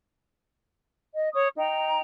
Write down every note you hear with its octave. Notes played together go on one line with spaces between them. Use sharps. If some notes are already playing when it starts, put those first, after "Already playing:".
D#5
C#5 C#6 D#6
D#4 G5 A#5